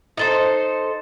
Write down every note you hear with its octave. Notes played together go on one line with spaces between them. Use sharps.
D#4 A4 C5